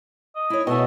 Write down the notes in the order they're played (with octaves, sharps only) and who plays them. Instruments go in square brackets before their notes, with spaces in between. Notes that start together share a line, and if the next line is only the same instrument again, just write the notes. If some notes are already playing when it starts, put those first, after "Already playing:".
[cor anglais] D#5
[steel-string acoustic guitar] E4 C#5
[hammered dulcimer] B2 [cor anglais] A3 [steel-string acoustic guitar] D#5 F#5 G#5